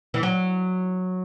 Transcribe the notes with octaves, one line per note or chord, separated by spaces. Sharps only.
E3
F#3